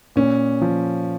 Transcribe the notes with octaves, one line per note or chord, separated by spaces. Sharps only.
A#2 C#4
F3